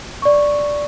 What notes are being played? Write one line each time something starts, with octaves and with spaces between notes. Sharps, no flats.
D5 C#6